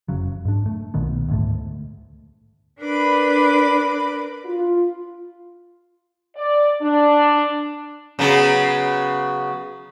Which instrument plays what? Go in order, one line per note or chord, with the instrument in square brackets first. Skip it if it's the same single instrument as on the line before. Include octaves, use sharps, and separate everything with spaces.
[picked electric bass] F#1 F2 C#3 F#3
G#2 D4
A3
B1 A#2 D#3 B3
D2 G#2 E3 A3
[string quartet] D4 A#4 B4 B5 D6
[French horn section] F4
D5
D4
[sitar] C#3 F#3 B3